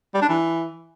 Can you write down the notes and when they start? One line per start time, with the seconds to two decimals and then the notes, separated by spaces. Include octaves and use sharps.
0.14 G3
0.22 D4
0.29 E3